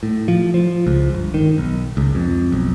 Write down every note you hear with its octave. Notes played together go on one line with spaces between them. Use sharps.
A2
F3
F3
C#2
G1
D#3
B1
C#2
F2
B1